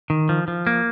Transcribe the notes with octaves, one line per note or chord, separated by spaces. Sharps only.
D#3
F3
F3
A#3